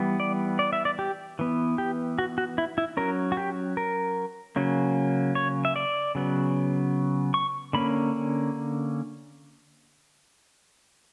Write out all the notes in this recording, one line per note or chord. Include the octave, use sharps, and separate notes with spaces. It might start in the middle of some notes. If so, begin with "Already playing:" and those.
Already playing: E3 G3 B3
D5
D5
E5
D5
G4
E3 B3
G4
F#4
F#4
E4
E4
F#3 C#4 A#4
F#4
G4
A#4
C#3 F#3 A#3 C#4
C#5
E5
D5
C#3 F#3 B3
C#6
D3 A#3 C#4 B5